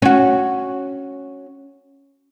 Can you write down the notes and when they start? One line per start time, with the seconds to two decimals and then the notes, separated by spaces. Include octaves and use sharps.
0.02 C#4 F#4